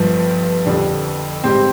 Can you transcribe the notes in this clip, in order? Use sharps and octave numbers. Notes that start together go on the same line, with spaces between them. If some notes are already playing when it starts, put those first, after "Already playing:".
Already playing: G1 G2 F3
F2 D3 G3 D4
G#2 G3 C4 G4